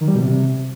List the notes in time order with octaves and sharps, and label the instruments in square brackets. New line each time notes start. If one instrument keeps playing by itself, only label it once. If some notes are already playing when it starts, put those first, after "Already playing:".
[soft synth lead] D#3
G3
B2
C3